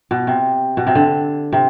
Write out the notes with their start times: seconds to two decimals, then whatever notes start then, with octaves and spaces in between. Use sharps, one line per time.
0.11 B2
0.27 C3
0.77 B2
0.87 C3
0.95 D3
1.52 C3